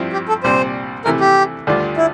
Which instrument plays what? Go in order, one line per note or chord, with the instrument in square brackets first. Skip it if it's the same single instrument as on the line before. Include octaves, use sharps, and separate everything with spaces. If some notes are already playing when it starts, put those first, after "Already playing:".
Already playing: [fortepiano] G2 F3 C4 E4
[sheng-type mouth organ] G4
A4
[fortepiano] C2 A#2 G3 C4 [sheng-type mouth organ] C5
[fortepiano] C3 E3 A3 E4 [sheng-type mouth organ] A#4
[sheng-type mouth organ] G4
[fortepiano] D2 D3 G3 D4 F4
[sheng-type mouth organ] E4